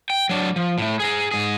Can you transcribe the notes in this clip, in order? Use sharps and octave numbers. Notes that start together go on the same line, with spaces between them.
G5
F#3 D4
F3
A2 A3
G#4 A#5
G#2 G#4